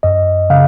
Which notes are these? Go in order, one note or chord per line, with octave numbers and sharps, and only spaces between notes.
F#2 D#5
C#3 F5